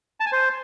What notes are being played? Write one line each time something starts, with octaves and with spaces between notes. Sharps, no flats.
A5
G#5
C5